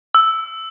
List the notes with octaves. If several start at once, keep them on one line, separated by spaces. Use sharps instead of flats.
E6